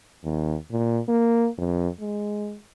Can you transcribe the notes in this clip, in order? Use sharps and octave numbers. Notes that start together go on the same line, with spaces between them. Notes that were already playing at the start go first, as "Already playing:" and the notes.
D#2
A#2
A#3
F2
G#3